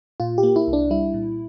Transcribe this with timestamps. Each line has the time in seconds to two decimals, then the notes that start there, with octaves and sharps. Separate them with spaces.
0.20 A#2 F4
0.38 G4
0.43 A#3
0.56 E4
0.68 C2
0.73 D4
0.90 G3 E4
1.14 A#2